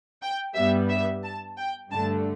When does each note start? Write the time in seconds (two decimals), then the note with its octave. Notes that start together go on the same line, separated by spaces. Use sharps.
0.22 G5
0.55 G2 G3 B3 E5
0.89 E5
1.23 A5
1.58 G5
1.91 G2 D3 A3 A5